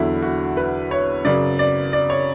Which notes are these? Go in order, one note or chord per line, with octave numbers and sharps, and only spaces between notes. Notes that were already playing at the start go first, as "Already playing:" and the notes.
Already playing: E2 D3 F#3 E4
F#4
B4
C#5
F#2 C#3 F#3 D5
D5
D5
C#5